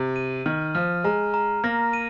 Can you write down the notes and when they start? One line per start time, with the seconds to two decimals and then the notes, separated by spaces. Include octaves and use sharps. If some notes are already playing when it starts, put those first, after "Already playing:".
Already playing: C3
0.16 D#7
0.46 D#3 F6
0.75 F3 F6
1.04 G#3 A#5
1.34 A#5
1.64 A#3 A#6
1.93 D#7